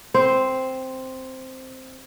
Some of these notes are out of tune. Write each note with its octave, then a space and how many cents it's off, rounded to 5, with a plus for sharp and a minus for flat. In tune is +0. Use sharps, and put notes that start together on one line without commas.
C4 +0 C5 +0